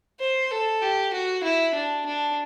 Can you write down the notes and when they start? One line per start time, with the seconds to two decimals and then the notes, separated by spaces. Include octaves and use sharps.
0.20 C5
0.51 A4
0.82 G4
1.13 F#4
1.44 E4
1.75 D4
2.06 D4